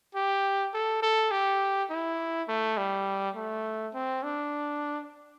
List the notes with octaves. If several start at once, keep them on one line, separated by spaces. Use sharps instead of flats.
G4
A4
A4
G4
E4
A3
G3
A3
C4
D4